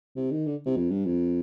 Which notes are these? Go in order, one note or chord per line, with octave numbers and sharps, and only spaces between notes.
C3
D#3
D3
C3
F2
G2
F2